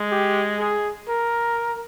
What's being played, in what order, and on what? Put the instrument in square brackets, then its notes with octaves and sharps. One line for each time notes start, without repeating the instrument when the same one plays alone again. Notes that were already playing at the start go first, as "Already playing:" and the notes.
Already playing: [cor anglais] G#3
[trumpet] G4
G#4
A#4